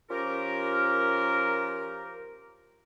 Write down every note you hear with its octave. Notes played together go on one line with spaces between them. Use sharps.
F3 C#4 F4 G4 A#4